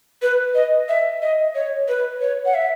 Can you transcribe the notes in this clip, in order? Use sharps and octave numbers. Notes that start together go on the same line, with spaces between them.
B4
D#5
E5
D#5
C#5
B4
C#5
F#5
E5